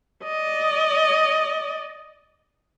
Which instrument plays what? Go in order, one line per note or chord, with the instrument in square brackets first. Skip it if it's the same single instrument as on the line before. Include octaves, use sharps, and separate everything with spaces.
[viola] D5 D#5